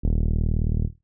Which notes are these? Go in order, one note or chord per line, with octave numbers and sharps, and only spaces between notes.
D#1